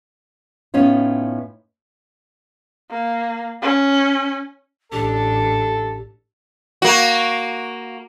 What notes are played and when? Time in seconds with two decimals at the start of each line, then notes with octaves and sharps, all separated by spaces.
0.74 A2 B3 C#4 D#4 F4
2.91 A#3
3.62 C#4
4.92 A1 D4 G4 A4
6.82 A#3 F#4